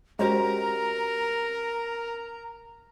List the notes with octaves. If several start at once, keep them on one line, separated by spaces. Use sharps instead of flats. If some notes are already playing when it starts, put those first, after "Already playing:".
G#3 C#4 F#4 G4 A#4 C5 A#5